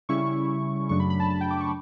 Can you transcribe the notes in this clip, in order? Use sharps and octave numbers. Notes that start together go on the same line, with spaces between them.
C#3 G3 C#4 E4 C#6
F#2 C#3 F#3 A3 D4 C#6
B5
B5
A5
A5
G5
D6
C#6